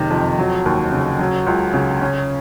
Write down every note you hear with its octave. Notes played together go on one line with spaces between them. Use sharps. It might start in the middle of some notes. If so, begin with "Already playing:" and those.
Already playing: F#1 C3 D#3
F2
F#3
D#2
C#3
F#3
C#2
C#3
C#4